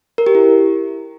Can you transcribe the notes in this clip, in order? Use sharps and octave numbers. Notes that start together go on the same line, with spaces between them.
A#4
G4
E4